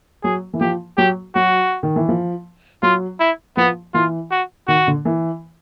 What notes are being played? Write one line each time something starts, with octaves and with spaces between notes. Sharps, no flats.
F#3 G#4
E3
F3 G4
F#3 G4
F#3 F#4
D#3
E3
F3
F#3 F4
E4
F3 B3
E3 F4
F#4
D#3 F#4
D3
E3